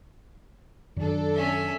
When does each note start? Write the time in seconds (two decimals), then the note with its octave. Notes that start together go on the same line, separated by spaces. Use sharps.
0.96 F#2 D#3 D4 A4
1.34 C#4 E5